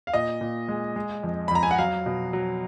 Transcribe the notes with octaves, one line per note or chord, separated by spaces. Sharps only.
F5
A#2 D#5
A#2
G#3
G#3
F2
B5
F2 A#5
G#5
F#5
F#3 F5
B2
F#3